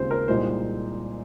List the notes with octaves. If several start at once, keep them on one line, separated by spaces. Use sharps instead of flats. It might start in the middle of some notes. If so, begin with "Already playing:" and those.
Already playing: D#2 C#3 G#3 C4 F4 C5
A#4
C2 A#2 G#3 D#4 C5